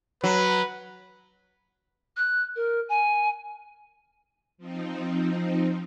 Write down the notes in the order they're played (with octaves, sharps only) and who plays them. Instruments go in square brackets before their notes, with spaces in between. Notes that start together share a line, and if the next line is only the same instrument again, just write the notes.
[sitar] F#3 [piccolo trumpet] B4
[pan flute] F#6
A#4
G#5
[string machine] F3 C4 D#4